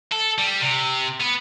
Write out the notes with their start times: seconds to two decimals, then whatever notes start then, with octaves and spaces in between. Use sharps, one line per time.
0.12 A4
0.39 G3
0.61 C3
1.21 B3